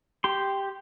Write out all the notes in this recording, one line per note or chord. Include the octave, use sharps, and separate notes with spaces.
G4 C6